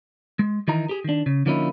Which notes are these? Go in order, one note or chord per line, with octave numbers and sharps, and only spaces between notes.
G#3
D#3 E3 D#4 A#5
G4 G#4
D#3 D4
C#3
D3 F3 A#3 C#4 D#4 E4